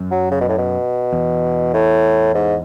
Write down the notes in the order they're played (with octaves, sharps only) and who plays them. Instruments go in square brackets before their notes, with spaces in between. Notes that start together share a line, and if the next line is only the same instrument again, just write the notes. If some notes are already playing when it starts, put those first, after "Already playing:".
Already playing: [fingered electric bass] F#2
[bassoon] F#3
C#3
B2
A2
B2
[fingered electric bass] E2
[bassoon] A2
G#2